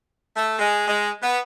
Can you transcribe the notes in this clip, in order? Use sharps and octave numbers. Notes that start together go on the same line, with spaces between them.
A3
G#3
G#3
B3